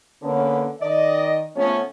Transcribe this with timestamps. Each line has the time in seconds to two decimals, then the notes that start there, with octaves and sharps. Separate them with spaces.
0.22 D3 A#3 B3 C#4
0.81 D#3 D5 D#5
1.56 C#3 F3 A3 B3 C#4